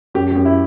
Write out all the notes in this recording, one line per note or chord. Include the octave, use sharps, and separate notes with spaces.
F#2 G4
G4
F#2
E4